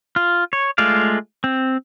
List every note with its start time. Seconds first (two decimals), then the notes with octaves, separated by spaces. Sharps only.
0.16 F4
0.53 C#5
0.78 G#3 A3 F4 D5 F5
1.44 C4